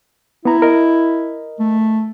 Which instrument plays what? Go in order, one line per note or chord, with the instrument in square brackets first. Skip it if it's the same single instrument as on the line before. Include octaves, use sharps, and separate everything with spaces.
[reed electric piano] B3 A#5 [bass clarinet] E4
[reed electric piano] A#4 D#5
[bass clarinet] A3